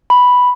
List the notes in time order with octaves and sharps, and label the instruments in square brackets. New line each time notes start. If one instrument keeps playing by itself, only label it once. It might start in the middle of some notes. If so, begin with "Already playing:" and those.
[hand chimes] B5